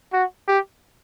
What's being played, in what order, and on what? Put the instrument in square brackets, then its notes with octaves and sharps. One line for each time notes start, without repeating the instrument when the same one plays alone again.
[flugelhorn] F#4
G4